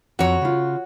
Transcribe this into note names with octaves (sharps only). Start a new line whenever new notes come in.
F2 F#4 C#5 A#5
C#3 F4